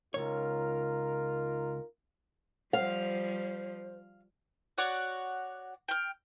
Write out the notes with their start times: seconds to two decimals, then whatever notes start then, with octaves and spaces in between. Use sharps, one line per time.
0.14 C#2 C3 D#4 F4 A#4 C#5
2.73 F3 G3 C5 F5
4.78 F#4 C#5 D5 F#5
5.88 G5 F6